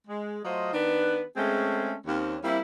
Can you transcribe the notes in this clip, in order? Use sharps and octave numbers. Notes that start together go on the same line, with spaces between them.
G#3
F#3 A3 F4 C5 D#5
D#3 B3 D4 B4
G#3 A3 C4 C#4 G#4 A4
D#2 C4 C#4
G3 A#3 C4 E4